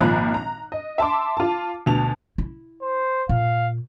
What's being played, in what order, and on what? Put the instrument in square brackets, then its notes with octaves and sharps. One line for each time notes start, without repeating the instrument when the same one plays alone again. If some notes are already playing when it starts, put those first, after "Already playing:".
[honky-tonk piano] G#1 A#2 F3 A#5 B5 F#6
A#5
D#5
E5 A5 C6 D6
F4 A5
D2 B2 A5 F7
[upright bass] E4
[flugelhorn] C5
[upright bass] A#2 [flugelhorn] F5